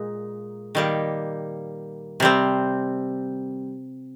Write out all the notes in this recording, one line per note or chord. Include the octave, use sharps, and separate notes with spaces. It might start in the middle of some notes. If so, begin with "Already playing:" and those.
Already playing: A#2 G#3
D#3 G3 A#3
C3 G3 C4